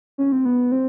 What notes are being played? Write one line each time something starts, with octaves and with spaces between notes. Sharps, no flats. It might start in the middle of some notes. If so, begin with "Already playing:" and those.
C#4
C4
B3
C4